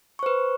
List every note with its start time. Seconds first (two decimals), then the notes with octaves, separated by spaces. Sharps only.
0.19 C#6
0.23 C5
0.26 B4